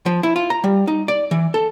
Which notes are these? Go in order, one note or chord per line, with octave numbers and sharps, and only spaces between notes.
F3
E4
F4
A#5
G3
D#4
D5
E3
A4